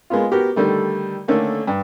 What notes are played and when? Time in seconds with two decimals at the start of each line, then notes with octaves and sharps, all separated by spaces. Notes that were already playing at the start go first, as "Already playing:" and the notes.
0.10 G#3 A#3 B3 F4
0.32 B3 F#4 G4 A#4
0.56 D3 D#3 G3 A3
1.28 D3 D#3 A3 A#3 C#4
1.67 G2